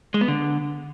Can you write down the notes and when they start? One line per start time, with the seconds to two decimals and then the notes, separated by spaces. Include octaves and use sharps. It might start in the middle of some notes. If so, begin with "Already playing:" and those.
0.14 G#3
0.21 B3
0.28 D3